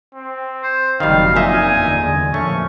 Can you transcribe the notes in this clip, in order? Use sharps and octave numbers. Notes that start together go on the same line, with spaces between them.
C4
C5
F#1 F2 D#3 F#3 G3 D#4 F5
A#2 D#4 E5 G#5
E2 D3
A#2 F3 A3 C#4 C#6